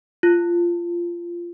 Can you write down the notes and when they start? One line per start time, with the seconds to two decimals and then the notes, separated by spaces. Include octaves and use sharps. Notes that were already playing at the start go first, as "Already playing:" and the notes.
0.23 F4